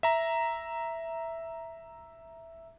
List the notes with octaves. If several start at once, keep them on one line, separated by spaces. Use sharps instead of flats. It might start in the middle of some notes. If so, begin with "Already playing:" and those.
E5 A#5